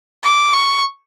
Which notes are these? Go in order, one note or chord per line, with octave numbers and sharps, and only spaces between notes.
D6
C#6